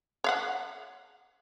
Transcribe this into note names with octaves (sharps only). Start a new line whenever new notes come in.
C#5 F5 F#5